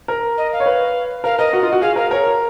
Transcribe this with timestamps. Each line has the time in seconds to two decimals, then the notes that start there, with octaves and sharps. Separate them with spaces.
0.08 A#4
0.37 D#5
0.52 F5
0.60 C#5
0.66 B4
1.24 A#4 F5
1.38 A#4 D#5
1.53 F#4
1.63 F4
1.72 F#4
1.81 G#4 F5
1.96 A#4 F5
2.10 A#4 C#5